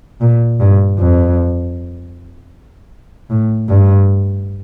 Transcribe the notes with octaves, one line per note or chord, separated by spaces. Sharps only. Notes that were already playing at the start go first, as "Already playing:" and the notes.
A#2
G2
F2
A2
G2